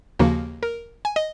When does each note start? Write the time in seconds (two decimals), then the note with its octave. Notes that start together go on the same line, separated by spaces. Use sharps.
0.19 D#2 C#3 F3 A#3 F#4
0.63 A#4
1.05 G#5
1.16 D#5